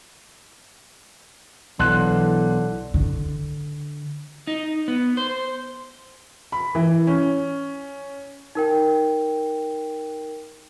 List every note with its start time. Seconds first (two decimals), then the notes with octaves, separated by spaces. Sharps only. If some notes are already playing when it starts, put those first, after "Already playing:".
1.79 B1 D3 E3 C6 F#6
2.94 D3
4.47 D#4
4.88 B3
5.17 C5
6.52 B5
6.75 E3
7.07 C#4
8.55 D#4 A#4 G5